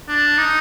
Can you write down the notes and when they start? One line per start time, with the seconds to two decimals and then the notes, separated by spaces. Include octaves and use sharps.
0.08 D4
0.38 D#4